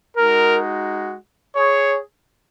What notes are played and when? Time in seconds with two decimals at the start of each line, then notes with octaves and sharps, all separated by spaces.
0.18 G#3 D#4 F#4 A#4
1.57 G#4 C#5